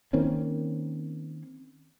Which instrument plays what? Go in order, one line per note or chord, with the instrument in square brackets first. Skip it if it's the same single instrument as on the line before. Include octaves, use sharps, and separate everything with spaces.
[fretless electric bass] D#3 A#3 C4 C#4